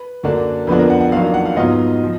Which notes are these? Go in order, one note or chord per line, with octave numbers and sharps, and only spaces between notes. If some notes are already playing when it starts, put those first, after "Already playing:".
Already playing: B4
F#2 D3 F#3 A#3 D4
F2 D3 F3 B3 D4 B4
A#4
F#5
F#5
F2 D#3 F#3 A#3 D4 F5
F5
F#5
F5
G#2 F#3 B3 F4 D#5
F3